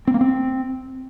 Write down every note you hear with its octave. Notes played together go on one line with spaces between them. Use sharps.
C4
A#3
C4